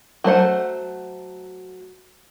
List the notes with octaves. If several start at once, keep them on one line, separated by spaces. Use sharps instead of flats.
F#3 A3 C5 F#5